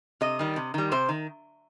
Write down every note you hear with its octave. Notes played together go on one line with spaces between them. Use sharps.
C3 D#5
D#3 G3
C3
D#3 G3
C3 C5
D#3